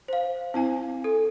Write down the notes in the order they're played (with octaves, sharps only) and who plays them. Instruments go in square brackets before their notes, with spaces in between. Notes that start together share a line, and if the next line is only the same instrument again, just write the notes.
[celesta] C5 F5
[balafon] C4 E4 G#5
[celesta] A4